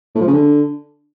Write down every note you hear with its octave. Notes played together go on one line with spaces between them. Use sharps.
A2
F3
C#3
D3